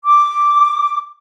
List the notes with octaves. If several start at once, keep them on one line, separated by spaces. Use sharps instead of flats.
D6